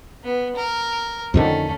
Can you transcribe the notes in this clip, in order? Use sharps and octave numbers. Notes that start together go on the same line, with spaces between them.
B3
A#4
F2 D3 D#3 A3 C#4